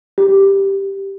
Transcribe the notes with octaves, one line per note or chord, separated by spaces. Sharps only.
G4